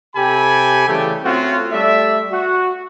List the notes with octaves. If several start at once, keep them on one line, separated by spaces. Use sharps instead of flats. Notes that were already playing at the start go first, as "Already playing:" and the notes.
C3 G4 A4 G5 G#5 B5
C#3 E3 G3 A3 G4 A4
A3 C4 C#4 F4 F#4
G3 A3 D5 E5
F#4